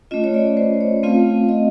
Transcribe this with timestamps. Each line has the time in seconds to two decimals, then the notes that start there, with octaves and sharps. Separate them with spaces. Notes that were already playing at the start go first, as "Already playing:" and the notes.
0.11 A3 C#4 F4 D#5
0.24 C#5
0.34 D5
0.57 C5
0.81 C#5
1.03 A3 C4 F4 F5
1.49 D#5